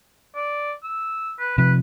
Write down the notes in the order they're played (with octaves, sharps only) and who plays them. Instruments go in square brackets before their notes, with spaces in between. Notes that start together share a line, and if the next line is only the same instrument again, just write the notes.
[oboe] D5
E6
B4
[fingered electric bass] C3 F3 [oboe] B4